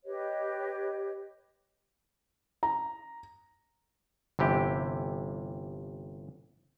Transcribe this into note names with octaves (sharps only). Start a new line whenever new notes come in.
G4 B4 C#5 D#5
A#5
G1 C3 E3 G4